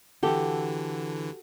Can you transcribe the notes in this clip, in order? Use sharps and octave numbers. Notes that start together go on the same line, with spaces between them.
D3 E3 F#4 G4 A4